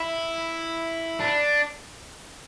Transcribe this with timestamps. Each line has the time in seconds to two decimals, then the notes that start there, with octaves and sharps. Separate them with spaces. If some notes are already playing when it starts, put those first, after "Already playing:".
Already playing: E4
1.20 D4